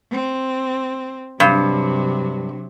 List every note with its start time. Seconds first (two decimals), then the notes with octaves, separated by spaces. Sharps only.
0.11 C4
1.40 G2 C3 F#3